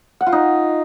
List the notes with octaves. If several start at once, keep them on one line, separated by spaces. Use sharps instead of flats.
F#5
F4
D#4